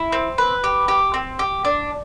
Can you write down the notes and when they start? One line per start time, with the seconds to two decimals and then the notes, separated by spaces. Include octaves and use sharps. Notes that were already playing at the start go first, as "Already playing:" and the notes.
Already playing: E4
0.12 C4
0.38 B4
0.64 G4
0.88 G4
1.14 C4
1.39 G4
1.65 D4